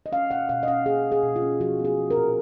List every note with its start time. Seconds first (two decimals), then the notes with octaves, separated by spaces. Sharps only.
0.06 D#5
0.12 C#4 F5
0.31 B2 F#5
0.49 B2 F5
0.63 D#5
0.68 C#4 F5
0.86 A#3 G#4
1.05 C#4
1.12 G#4
1.23 B2
1.36 F4
1.42 C#4
1.60 F3 F#4
1.79 B3
1.85 G#4
1.97 F3
2.11 A#4
2.17 A#2